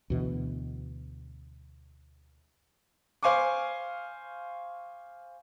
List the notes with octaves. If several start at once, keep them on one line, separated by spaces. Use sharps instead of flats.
D2 B2 E3
C5 F5 G#5 C#6 D6